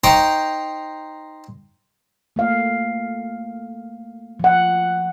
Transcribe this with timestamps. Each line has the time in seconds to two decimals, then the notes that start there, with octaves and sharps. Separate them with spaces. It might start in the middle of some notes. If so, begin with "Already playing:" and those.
0.04 D#4 C5 G5 A#5 C#6
2.36 A3 A#3 F5
4.40 F3 F#5